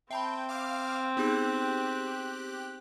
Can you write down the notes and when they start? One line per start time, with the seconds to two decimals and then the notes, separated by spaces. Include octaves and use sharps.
0.11 C4 E5 G5 A5 B5
0.49 F5 D6 F6
1.17 B3 D#4 G4 G#4 F#6